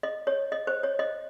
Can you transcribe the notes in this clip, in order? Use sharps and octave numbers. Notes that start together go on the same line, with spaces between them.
D#5
C#5
D#5
C5
C#5
D#5